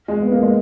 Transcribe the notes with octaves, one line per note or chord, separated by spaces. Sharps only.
G#3
B3
A#3
G#3